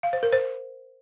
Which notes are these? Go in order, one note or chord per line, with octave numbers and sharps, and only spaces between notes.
F5
C5
A#4
C5